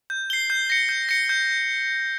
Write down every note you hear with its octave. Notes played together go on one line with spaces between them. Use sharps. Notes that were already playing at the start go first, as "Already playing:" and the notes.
G6
C7 G7
G6
A#6 C#7
G6
A#6 C#7
G6